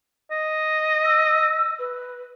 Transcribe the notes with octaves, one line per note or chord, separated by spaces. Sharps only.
D#5
E6
B4